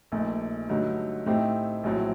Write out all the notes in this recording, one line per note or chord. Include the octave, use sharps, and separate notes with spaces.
A#1 A#2 A3 D#4
G2 D3 F#3 A3 D#4
A2 A3 C4 D#4 G4
A#1 A2 F#3 C4